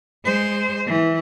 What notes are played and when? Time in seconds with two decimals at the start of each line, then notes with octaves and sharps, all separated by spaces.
0.25 G#3 C5
0.87 E3